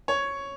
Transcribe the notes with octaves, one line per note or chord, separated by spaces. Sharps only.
C#5